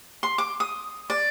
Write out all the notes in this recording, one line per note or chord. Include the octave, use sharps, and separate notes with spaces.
C6
D6
D#6
D5